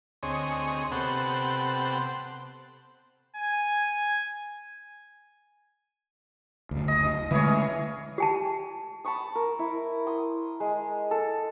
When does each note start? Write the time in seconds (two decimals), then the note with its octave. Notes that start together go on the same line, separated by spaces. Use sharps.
0.23 D2 C4 G#4 C#5 D#5
0.92 C3 B3 G4 A4 C5 F#5
3.36 G#5
6.71 F#1 D2
6.88 D#5
7.31 D3 E3 G#3 A3 G#4 C#5
7.43 C#4
8.18 G4 G#5 A5
9.04 A5 B5 C#6 D#6
9.35 A#4
9.59 E4
10.07 C6 D#6
10.60 G#3
11.11 A4